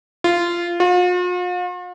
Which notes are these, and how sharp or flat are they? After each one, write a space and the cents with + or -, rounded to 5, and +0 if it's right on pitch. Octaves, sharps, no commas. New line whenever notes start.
F4 -15
F4 +45